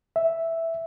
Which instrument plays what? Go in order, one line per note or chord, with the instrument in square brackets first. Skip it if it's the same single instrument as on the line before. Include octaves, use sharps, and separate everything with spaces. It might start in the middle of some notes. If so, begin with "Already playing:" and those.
[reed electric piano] E5